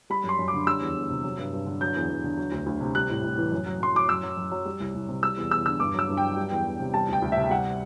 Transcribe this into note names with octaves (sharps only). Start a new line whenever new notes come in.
G3 B5
F#2
C6
F#2
D6
D3
G3 E6
E2
E2
C3
F#3
G2
G2
D3
F#3 G6
E2
E2
D3
F#3
D2
D2
C3
G3 F#6
A2
A2
E3
F#2
F#3
F#2 C6
F#3 D6
F#2 E6
F#3
F#2
F#3
G3
C2
C2
C3
G3 E6
E2
E2 E6
D3 E6
G2 D6
F#3 E6
G2
G5
F#3
G3
E2
E2
C3
G3 A5
D2 G5
D2
C3 E5
G3 F#5